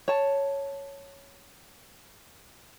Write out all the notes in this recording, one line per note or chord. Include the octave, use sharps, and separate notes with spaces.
C#5 A5